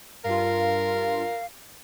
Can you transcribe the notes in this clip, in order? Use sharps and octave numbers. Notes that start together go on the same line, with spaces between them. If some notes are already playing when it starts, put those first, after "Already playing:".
G2 F4 A#4 F5